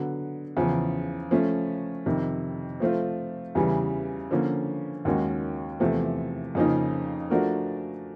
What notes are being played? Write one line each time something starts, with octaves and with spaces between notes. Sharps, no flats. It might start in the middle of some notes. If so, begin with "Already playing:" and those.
Already playing: D3 F#3 B3
E2 C#3 F3
F3 A3 C#4
F2 C3 D#3
F3 A3 C4 F4
E2 C#3 E3 G3
D3 F3 A#3 C#4
D#2 D#3 G#3 C#4 F#4
E2 C3 F3 A3
F2 C#3 F3 A#3 D#4
F3 A3 D4 F#4 A#4